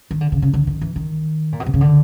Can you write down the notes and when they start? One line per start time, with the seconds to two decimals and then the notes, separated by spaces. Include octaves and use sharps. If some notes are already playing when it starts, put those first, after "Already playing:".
0.11 D#3
0.21 D3
0.32 C#3
0.42 C#3
0.53 D3
0.67 D#3
0.81 E3
0.96 D#3
1.52 A#2
1.60 B2
1.66 C3
1.73 C#3
1.81 D3